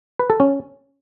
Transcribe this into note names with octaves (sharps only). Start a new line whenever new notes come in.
B4
A4
C#4